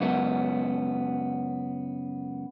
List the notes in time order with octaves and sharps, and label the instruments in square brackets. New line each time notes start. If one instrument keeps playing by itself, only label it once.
[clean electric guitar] C#2 F#2 B3